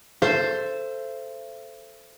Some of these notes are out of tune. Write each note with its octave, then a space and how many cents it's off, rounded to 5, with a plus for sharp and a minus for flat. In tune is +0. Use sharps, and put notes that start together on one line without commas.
A4 +5 C5 +0 E5 +40